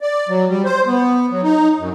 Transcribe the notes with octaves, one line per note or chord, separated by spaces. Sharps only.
D5
F#3
G3
C5
B3
F#3
D#4
F#2